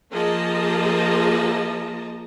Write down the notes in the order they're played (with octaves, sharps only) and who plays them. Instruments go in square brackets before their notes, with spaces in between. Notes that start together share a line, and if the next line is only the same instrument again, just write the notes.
[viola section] F3 A#3 G#4 D#5 A5 A#5